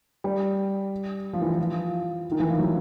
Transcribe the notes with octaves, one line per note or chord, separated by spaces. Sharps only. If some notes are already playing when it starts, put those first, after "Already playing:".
G3
F3
E3
F3
D#3
E3
F3
F#3